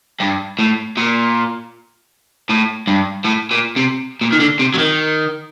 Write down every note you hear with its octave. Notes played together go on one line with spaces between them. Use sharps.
G2
A2
A#2
A2
G2
A2
A#2
C3
A#2
D#3
D3
C3
F#3
D#3